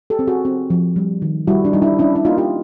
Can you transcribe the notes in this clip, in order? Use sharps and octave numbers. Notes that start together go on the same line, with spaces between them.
G4 A4
C4
F#4 G#4
C4
F3
G3
D#3
G3 E4 F#4
D4
G3 D#4
D4 E4
C#4 D4 E4
E4
A#3 D#4 F4
F4 G4